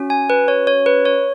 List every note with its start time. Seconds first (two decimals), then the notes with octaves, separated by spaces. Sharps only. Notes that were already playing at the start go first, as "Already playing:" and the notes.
Already playing: C#4 F#4
0.10 G#5
0.30 B4
0.48 C#5
0.67 C#5
0.86 B4
1.05 C#5